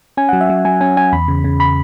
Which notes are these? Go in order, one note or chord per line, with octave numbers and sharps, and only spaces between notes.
C#4 G#5
F#3 F#5
E5
F#3
F#3 G#5
C#4 G#5
C#4 G#5
E2 B5
C#3
C#3
B5